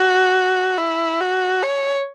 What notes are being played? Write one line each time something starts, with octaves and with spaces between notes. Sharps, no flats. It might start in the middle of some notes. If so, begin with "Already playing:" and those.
Already playing: F#4
E4
F#4
C#5